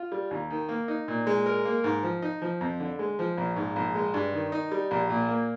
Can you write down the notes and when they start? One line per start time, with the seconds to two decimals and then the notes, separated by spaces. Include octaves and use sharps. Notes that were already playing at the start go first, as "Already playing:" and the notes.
Already playing: F4
0.12 G3
0.31 D#2
0.50 D#3
0.69 A#3
0.88 D#4
1.08 A#2
1.27 G#3
1.46 A#4
1.65 A#3
1.84 G#2
2.03 F3
2.22 D#4
2.42 F3
2.61 F2
2.80 D3
2.99 G#3
3.19 F3
3.37 A#1
3.56 G#2
3.76 A#1
3.95 G#3
4.14 G2
4.33 D#3
4.52 D#4
4.72 G3
4.91 A#1
5.10 A#2
5.29 A#3